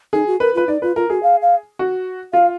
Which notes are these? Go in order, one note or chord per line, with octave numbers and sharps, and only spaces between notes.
D#4 G#4
F#4
A#4 B4
F4 B4
D#4 D5
F4 B4
F4 A#4
F#4 G#4
F5
F5
F#4
F4 F5